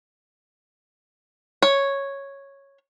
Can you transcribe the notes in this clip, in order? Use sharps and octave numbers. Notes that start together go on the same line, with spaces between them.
C#5